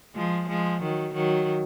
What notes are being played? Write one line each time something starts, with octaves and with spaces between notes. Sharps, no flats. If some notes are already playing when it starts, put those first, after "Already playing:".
F3 G#3
F3 G#3
D#3 F#3
D#3 F#3